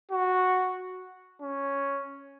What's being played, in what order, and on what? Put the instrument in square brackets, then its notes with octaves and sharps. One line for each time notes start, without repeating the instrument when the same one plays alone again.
[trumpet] F#4
C#4